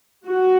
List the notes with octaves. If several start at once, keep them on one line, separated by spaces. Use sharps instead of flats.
F#4